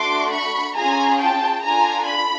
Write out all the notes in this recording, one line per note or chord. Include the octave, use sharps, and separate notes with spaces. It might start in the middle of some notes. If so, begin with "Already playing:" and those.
Already playing: A3 D4 F#4 C6 D6
B5 C#6
C#4 F4 G#4 G#5 A#5
G5 A5
D4 F4 A4 G#5 A#5
B5